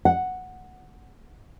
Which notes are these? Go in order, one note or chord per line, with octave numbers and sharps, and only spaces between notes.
F#5